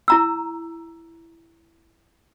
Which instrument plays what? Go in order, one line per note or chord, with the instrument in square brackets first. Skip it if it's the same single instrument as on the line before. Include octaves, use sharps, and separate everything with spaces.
[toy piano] E4 A#5 E6